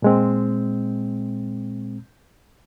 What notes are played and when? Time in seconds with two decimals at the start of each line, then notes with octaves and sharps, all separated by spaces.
0.02 A#2 G#3 C4